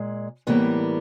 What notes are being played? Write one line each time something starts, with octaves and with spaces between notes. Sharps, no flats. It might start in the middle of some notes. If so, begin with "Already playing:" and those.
Already playing: A#2 G#3
A2 E3 G3 A#3 B3